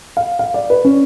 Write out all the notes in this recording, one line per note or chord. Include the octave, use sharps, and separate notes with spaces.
F5
F5
D5
B4
C#4